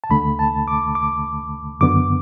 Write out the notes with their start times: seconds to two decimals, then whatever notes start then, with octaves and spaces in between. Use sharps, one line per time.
0.04 A5
0.10 D2 D3 A3 B5
0.39 A5
0.68 D6
0.95 D6
1.81 F#2 D3 B3 D6